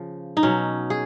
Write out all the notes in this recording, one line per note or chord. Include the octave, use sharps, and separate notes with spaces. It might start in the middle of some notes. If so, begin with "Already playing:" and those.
Already playing: C#3 F3
D#4
B2 F#3 C#4
G#4